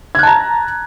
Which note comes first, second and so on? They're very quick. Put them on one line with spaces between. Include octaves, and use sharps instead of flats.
G#6 F#6 A5 A#5